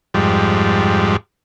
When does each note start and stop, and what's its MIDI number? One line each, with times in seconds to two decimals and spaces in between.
0.14 1.16 41
0.14 1.16 44
0.14 1.16 55